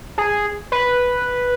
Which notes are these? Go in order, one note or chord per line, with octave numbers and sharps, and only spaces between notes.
G#4
B4